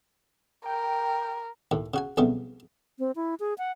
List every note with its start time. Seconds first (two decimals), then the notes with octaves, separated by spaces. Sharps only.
0.66 A#4 G5
1.71 D#2 A2
1.94 C#3 F#4 G#5
2.17 B1 F2 C#3 G3 A3 B3
2.99 C4
3.16 E4
3.40 G#4
3.58 F#5